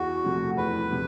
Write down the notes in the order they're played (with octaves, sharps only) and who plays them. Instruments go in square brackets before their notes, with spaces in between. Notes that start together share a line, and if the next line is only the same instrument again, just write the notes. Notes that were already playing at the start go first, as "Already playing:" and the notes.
Already playing: [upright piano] E2 [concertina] F#4
[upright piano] C3 F3 A3
[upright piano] E2 [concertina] B4
[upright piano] C3 F3